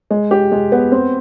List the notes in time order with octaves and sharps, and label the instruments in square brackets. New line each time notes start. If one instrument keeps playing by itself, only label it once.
[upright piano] G#3
G4
G#3
B3
C4